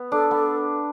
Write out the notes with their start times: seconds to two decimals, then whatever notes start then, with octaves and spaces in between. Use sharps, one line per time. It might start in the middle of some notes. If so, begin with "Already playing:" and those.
Already playing: B3
0.12 D4 A4
0.31 B3